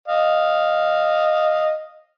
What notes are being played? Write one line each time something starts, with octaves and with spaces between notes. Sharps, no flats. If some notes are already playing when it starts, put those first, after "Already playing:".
D#5 F5